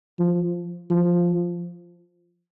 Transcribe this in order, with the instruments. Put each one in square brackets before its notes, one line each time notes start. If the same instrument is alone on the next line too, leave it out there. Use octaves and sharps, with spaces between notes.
[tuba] F3
F3